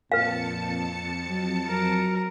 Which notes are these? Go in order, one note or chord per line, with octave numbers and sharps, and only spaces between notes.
F2 A#2 B4 F5 A5 C#7
F#3
F#3 A#4